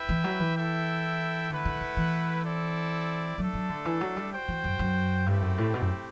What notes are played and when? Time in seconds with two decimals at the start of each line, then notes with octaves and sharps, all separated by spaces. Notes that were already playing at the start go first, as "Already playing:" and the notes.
Already playing: E4 B4 E5 G5
0.09 E3
0.24 F#3
0.40 E3
0.55 E4 A4 E5 G5
1.50 D3 A3 E4 B4 F#5
1.65 D3
1.81 D3
1.97 E3
2.44 C4 E4 A4 D5
3.37 F#3 A3 D4 A4
3.54 F#3
3.69 D3
3.85 E3
4.01 F#3
4.16 G3
4.32 F#4 C5 G5
4.48 E3
4.64 F#2
4.79 F#2
5.26 G2 A3 C4 E4 G4
5.42 F#2
5.58 A2
5.74 B2
5.82 F#2